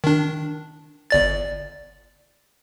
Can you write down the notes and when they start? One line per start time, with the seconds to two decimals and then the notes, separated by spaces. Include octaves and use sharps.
0.04 D#3 D4
1.10 G1 D5 A6